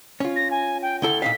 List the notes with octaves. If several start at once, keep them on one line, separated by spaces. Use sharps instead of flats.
C#4 F4
A#6
G#5
G5
D2 E4 A4 G7
A#2 D#4 F5 B6